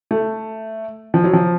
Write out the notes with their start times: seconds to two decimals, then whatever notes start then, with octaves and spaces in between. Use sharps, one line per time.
0.11 A3
1.14 F3
1.24 F#3
1.33 F3